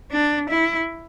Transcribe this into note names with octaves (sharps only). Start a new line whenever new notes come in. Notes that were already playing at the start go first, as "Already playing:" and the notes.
D4
E4